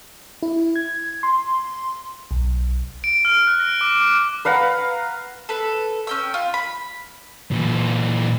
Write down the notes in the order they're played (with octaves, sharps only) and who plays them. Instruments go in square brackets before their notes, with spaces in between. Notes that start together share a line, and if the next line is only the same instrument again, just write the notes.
[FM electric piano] E4
G#6
C6
B1
[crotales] D7
F6
F#6
A#6
D6
D6
[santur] B4 F5 F#5 A#5
[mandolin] A4 B4
C#4 G5 E6
F4
B5
[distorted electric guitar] A#2 E3